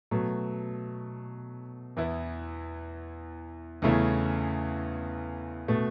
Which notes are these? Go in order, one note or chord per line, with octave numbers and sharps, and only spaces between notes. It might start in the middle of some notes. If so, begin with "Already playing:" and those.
B2 F#3 A3
E2 E3 B3 E4
E2 C#3 A3 C#4 E4
B2 A3